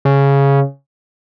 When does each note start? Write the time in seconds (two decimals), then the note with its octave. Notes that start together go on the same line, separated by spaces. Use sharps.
0.05 C#3